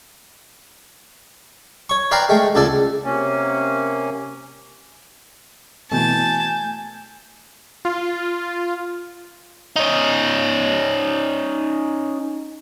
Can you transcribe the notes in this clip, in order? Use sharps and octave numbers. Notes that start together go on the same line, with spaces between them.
C#5 C#6
B4 D5 F5 G5 A#5 C6
G#3 A3 G5
C#2 C#3 A4 D5
C3 A#3 C#4
B2 E3 A3 G#5 A5 G6
F4
C#4 D#4